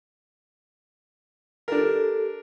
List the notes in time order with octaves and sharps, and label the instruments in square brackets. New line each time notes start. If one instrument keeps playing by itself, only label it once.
[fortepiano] D4 A#4 [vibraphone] G4 A4